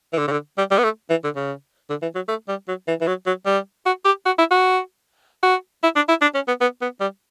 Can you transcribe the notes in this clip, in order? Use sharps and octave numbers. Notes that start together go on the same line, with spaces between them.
E3
D3
C#3
D3
G3
G3
B3
A3
E3
D3
C#3
D3
E3
F#3
A3
G3
F#3
E3
E3
F#3
F#3
G3
F#4
G4
F#4
E4
F#4
F#4
E4
D4
E4
D4
C#4
B3
B3
B3
G3